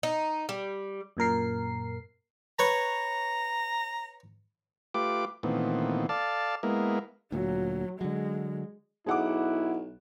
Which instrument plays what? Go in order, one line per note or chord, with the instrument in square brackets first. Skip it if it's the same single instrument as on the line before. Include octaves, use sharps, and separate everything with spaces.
[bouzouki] D#4
G3
[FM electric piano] F#2 A#2 A#4 C7
[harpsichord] B4 C#5 [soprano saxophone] A#5
[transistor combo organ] A3 F4 G4 B4 D6
A#2 D#3 E3 A3 B3 C4
A4 D5 F5 A5
G#3 A#3 B3 E4 A#4
[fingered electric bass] D2 A#2 [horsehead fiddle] F#3
[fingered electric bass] D3 F#3 [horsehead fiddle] G#3
[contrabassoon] B1 [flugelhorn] E4 [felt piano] G#4 F#5 D6